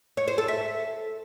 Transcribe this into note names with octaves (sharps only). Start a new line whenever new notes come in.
C#5
C5
A4
E5